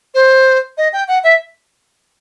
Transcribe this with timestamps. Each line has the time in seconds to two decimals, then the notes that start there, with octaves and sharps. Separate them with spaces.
0.15 C5
0.78 D#5
0.93 G5
1.08 F#5
1.24 E5